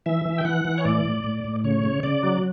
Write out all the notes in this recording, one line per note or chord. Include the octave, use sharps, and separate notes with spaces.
E3 E5
E3
G5
E3 F#5
E3
C#5
A2 D5
A2
A2
A2
C#3 C#5
C#3
C#3 D5
F#3